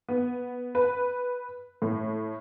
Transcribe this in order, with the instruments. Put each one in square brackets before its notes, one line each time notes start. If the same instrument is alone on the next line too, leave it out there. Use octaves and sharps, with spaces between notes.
[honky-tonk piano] B3
B4
A2